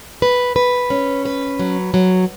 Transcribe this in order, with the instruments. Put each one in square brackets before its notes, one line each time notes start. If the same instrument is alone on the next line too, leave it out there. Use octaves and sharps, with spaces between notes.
[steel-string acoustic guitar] B4
B4
C#4
B4
F#3
F#3